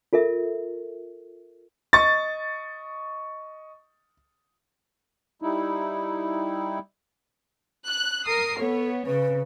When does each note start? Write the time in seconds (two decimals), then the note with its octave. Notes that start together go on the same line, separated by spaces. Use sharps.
0.13 F4 A4 A#4 E5
1.93 D#5 C#6 A6
5.42 G3 D#4 E4
7.87 F#6
8.26 A#4 D#6 C7
8.59 B3 A4 C#5
9.07 C#3 B4